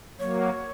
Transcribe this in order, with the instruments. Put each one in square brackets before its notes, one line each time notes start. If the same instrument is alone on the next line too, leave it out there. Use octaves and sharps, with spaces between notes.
[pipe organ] F#3 A#3 [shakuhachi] C#5